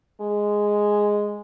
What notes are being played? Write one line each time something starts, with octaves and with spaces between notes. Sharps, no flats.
G#3